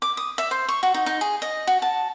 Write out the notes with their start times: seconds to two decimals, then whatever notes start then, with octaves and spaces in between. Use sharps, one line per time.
0.02 D6
0.17 D#6
0.38 E5
0.51 C5
0.69 C#6
0.83 F#4
0.94 D#4
1.06 D#4
1.21 G#4
1.42 D#5
1.67 F#4
1.82 A5